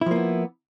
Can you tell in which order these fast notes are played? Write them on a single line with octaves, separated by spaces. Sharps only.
E4 F3 A#3 B3